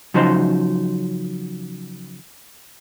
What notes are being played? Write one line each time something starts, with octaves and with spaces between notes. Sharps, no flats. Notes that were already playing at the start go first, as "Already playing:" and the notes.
C#3 F3 F#3 D#4 C5